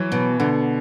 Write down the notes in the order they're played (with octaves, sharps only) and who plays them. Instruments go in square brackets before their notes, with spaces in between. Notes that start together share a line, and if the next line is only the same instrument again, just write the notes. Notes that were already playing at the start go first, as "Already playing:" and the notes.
Already playing: [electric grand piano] E3 [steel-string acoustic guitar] F#3
[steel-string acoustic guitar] B2
[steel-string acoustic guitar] B2 [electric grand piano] D3